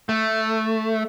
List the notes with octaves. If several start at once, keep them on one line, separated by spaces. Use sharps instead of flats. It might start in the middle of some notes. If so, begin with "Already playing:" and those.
A3